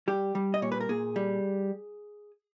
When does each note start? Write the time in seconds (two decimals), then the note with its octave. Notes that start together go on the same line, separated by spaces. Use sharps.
0.08 G3 G4
0.35 G3
0.54 D#5
0.62 A#2 C#5
0.72 B4
0.81 A#4
0.89 A#2 G#4
1.16 G3